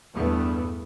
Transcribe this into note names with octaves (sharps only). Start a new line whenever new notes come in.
E2 G2 A3 B3